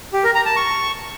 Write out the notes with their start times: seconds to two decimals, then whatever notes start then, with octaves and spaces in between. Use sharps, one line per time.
0.13 G4
0.24 A#4
0.35 A#5
0.46 A5
0.56 C#6